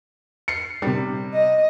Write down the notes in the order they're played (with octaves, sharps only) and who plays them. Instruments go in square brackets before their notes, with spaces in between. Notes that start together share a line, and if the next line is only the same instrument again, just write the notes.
[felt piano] C7 C#7
C3 G3
[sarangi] D#5